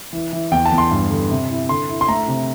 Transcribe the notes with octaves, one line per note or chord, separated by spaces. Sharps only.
E3
E3
E2 G5
A5
E2
C6
G2
D3
C3
E4
D3 C6
E4
C6
A3 A#5
C3